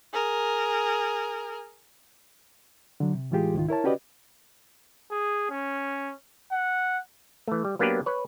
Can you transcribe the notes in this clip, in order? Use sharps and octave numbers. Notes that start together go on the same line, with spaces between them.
G#4 A#4
D3 F#3
C3
A2 E3 G#3 F4 G4 G#4
C#2 G#2 D#3 F4
E4 A#4 C#5 A5
C#4 F#4 G4 B4 D5 D#5
G#4
C#4
F#5
E3 A3
G3
F#3 A#3 B3 D4 G4 B4
B4 C#5